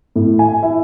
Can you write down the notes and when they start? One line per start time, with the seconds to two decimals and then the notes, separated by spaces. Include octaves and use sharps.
0.16 A2
0.39 G#5
0.63 E4